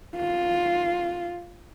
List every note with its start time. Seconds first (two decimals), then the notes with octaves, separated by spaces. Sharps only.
0.17 F4